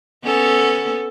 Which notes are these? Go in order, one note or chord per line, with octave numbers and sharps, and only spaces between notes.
B3 C#4 A4